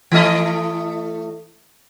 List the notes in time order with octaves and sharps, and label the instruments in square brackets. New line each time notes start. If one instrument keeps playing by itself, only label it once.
[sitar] E3 A3 D#5